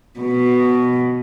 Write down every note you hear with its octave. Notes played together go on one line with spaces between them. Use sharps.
B2